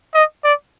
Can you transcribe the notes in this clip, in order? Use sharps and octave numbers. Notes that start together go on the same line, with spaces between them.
D#5
D5